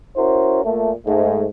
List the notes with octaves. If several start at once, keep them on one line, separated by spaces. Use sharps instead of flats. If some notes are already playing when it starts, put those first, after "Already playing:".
C#4 E4 F#4 A#4 C5
A#2 A3
G#2 A3